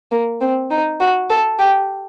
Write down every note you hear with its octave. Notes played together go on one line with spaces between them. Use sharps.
A#3
C4
D#4
F#4
A4
G4